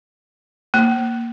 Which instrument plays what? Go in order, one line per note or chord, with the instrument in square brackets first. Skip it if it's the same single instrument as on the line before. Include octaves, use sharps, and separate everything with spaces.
[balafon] A#3